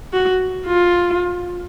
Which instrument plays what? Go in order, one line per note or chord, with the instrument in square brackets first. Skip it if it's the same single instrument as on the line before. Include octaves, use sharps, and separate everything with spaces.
[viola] F#4
F4